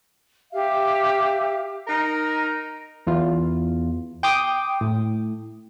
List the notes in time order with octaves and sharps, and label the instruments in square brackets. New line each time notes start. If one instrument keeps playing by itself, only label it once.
[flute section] G4 E5 F5
[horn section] D#4 A#4
[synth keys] E2 F4
G5 C6 D6 D#6
A2